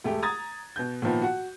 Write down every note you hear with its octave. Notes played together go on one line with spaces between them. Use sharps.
E1 A3 G4
A#5 D#6 G#6 A6
B2 G6
A#2 D#3 F3 B3
F#4 F#5